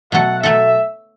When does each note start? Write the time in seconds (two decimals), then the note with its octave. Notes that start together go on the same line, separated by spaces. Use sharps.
0.12 B2 F#3 A3 F#4 A4 F#5
0.43 B2 F#3 A3 F#4 A4 E5